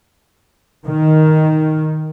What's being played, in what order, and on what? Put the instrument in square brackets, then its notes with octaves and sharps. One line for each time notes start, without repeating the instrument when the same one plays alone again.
[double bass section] D#3